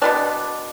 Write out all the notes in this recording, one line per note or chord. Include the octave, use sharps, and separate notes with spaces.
B2 B3 D4 D5